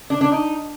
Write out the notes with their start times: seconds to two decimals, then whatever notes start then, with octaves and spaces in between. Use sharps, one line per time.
0.10 D4
0.21 D4
0.32 D#4